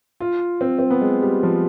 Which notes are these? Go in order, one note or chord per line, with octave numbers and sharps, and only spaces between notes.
F4
C4
C4
B3
G#3
G3
F3